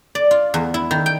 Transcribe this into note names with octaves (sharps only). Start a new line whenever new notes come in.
D5
F4
E2
E4
D#3
G5